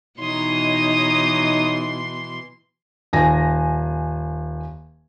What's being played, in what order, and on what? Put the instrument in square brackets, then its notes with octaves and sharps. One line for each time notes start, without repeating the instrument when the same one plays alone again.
[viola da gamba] B2 E3 [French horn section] D#4 [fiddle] C#5 D#6 [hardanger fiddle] C6
[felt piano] D#1 G#5 A#6